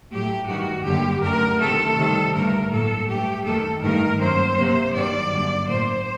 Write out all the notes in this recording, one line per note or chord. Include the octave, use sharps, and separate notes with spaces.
A2 F#3 A3 G4
G2 D#3 G3 F#4
F#2 D3 G3 A#3 G4
F#2 D3 A3 A#4
C3 D#3 A3 A4
C3 D#3 G3
G2 D3 A3 A#4
A2 F#3 A#3 A4
G2 F#3 A3 G4
F#2 D#3 A3 A4
G2 D#3 A3 A#4
F#2 F#3 A#3 C5
C3 F#3 A#3
G2 D#3 F#3 D5
F#2 D3 F#3 A#3
A2 F#3 A#3 C5